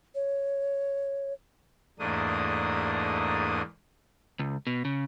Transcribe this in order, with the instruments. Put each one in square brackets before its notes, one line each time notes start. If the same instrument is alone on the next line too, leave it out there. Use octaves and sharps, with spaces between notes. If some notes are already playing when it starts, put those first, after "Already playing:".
[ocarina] C#5
[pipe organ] E2 G#2 A3 A#3 D4 D#6
[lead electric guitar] C#2
B2
C#3